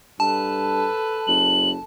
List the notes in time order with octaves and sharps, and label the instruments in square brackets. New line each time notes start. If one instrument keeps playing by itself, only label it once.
[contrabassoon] G2 [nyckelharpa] A4 B4 [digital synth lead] A5
[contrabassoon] F#1 [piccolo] F#7